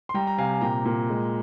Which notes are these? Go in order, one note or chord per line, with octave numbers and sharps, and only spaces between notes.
C6
G3 G5 A#5
A#5
C3 F5 G#5
G#5
A#2 G5 A#5
A#2
G#3